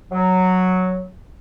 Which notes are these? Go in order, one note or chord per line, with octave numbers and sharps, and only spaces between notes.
F#3